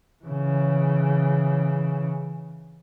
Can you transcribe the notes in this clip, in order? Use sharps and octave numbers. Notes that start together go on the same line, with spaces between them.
C#3 E3